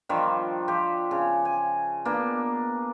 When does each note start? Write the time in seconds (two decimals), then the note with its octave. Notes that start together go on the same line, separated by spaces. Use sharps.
0.09 D#3 F3 G3 D4
0.68 F3 G4 C5
1.11 C#3
1.45 G#5
2.05 A#3 B3 D4